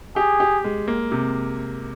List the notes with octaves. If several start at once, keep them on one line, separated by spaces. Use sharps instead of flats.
G4 G#4
G4
G#3
A#3
C3